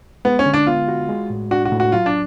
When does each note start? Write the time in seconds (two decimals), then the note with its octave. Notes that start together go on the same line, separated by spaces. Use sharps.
0.25 G#3 B3
0.39 C#4
0.46 D3
0.54 D4
0.67 B3 F4
0.88 F#4
1.09 G#3
1.30 A2
1.51 D4 F#4
1.65 F#4
1.72 A2
1.80 F#4
1.92 F#3 F4
2.06 D4